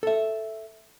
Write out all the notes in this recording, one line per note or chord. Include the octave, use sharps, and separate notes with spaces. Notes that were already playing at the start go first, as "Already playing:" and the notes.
A4 E5